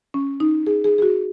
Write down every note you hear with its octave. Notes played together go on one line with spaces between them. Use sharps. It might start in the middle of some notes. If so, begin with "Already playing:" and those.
C#4
D#4
G#4
G#4
G#4
F#4